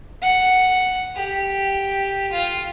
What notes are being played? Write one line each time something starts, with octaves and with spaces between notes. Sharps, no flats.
F#5
G4
F4